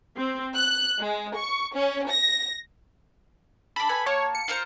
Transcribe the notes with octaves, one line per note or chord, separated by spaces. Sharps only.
C4
F#6
G#3
C#6
C#4
A#6
D4 A4 B5
A4 B4 G#5
A#3 C#5 A5
C#7
F4 A#4 C5